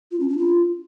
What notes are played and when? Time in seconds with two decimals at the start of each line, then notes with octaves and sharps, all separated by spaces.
0.11 F4
0.20 C#4
0.29 D4
0.38 F4